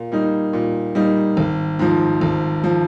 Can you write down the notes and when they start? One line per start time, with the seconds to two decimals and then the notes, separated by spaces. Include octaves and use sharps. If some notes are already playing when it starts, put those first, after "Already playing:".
Already playing: A#2
0.12 G3 A#3 D#4
0.53 A#2
0.95 G3 A#3 D#4
1.37 G#1
1.79 G#2 F3
2.21 G#1
2.64 F3